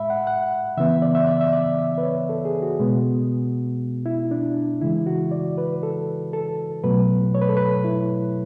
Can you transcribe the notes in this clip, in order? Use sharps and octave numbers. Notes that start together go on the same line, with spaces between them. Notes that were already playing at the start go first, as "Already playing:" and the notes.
Already playing: A2 G#3 E5 B5
F#5
F#5
C#3 E3 B3 E5
D5
E5
D5
E5
D5
E5
B4
C#5
A4
G#4
F#4
B2 G#3 B3
E4
D4
C#3 E3 G#3 E4
F#4
D5
B4
A4
A4
B2 F#3 A3 B4
C#5
B4
A4
B4
E4